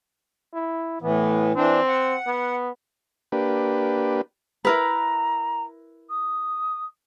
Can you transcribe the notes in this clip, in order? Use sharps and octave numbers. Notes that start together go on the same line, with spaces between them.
E4
A2 E3 B3
E3 C4 D4
F#5
B3
A#3 D4 G4 B4
E4 A#4 B4 A#5
D#6